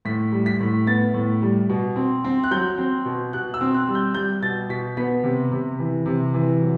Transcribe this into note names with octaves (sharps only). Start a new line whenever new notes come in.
A2 B6
G3
B6
A2
B3 A6
A2
G3
B2
C4
C4
F#6
F#3 G6
C4
B2
B2 F#6
E6
C4
F#6
G3
G6
G3 G6
B2 A6
B2 B6
B3 B6
C3
C3
E3
C3
E3
F#3